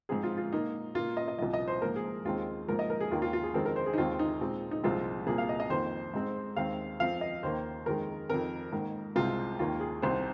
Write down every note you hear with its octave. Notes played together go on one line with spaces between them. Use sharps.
G#2 F3 C4 G#4
F4
F4
A#2 A#3 D#4
A#2 A#3 F4
D#5
D#5
C2 A#2 F3 D#5
D#5
C5
G#2 F3 A#3 A#4
G#4
D#2 D#3 G#3 C4 F4
G#2 F3 A#3 A#4
D#5
A#4
G#4
D#2 D#3 A#3 F4
F4
F4
G#4
F2 D#3 G#3 C4 A#4
A#4
C5
G#4
D#4
D#2 D#3 G#3 C4 F4
D#4
A#2 G#3 C4
D#4
C2 A#2 F3 G#3 C4 F4
C2 A#2 A#3 G#4
F5
D#5
D#5
F2 D#3 A#3 C5
G#2 G#3 C4
D#2 D#3 G#3 C4 F5
F2 F3 C4 F5
D#5
D#2 D#3 A#3 C5
F2 D#3 G#3 A#4
F2 D#3 C4 A#4
G#2 D#3 A#3 A#4
C2 C3 G#3 C4 F4
D#2 D#3 A#3 F4
G#4
C2 C3 D#3 C4 C5